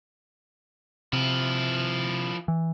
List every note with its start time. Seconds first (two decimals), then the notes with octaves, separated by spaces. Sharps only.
1.13 C3 F3 E4
2.48 E3